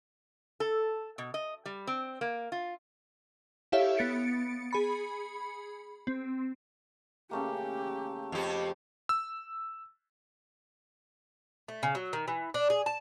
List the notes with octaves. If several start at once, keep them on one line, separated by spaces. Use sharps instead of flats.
A4
B2
D#5
G3
C4
A#3
F4
E4 G4 A4 C#5 E5 F5
B3 A6 C#7 D7
G#4 B5 C#7
C4
C#3 A3 A#3 G4
F2 G4
E6
A3
C#3
F#3
D#3
E3
D4
G#4
A5